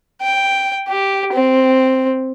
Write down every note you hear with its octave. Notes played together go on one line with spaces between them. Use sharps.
G5
G4
C4